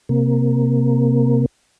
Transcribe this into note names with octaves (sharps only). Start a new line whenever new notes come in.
C3 A#3